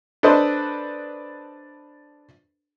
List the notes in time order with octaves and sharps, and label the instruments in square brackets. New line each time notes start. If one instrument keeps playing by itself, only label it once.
[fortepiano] D4 A4 B4 C5 D#5